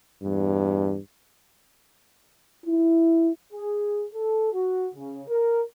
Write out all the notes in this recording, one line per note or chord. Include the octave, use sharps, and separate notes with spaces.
E2 G2
E4
G#4
A4
F#4
C#3
A#4